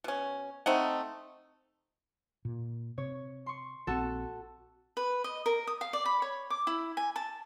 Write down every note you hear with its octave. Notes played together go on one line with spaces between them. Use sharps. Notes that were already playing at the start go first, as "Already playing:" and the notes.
B2 C#4
A3 C4 D#4 F#5
A#2
C3 C#5
C6 C#6
A#1 C4 F#4 A4
B4
D#5
A#4
D#6
F5
D5
B5
C#5
D6
E4
G#5
A5